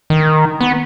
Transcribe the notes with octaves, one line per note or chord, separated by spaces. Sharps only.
D#3
B3